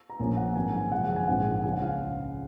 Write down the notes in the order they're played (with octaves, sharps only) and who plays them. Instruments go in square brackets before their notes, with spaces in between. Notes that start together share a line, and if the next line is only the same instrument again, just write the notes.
[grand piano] A#5
A#1 A#2 F3 A#3 C#4 G#5
F#5
G#2 D#3 F#3 C4 G#5
G#5
F#1 F#2 F3 G#3 F#5
F#5
G#5
A#1 G#2 F3 G#3 C4 F#5
C#2 C#3 G#3 G#5
F#5
F5